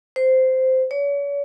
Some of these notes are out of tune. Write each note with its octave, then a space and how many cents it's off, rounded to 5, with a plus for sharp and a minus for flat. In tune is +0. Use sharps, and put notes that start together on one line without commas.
C5 -10
C#5 +40